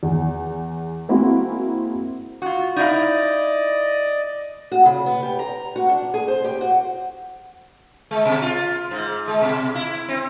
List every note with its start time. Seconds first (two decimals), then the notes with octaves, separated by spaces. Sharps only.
0.03 E2
1.09 G#3 A#3 C4 E4 F#4 G#4
2.42 F4 F#4
2.76 D#4 E4 D5 D#5 F5
4.72 F#4
4.86 C#3
5.06 B3
5.23 G4
5.39 A#5
5.76 F#4
5.89 D4
6.14 G#4
6.28 C5
6.44 G4
6.61 F#4
8.11 G#3
8.25 B2
8.42 F4
8.91 G#2
9.28 G#3
9.41 B2
9.75 E4
10.09 C4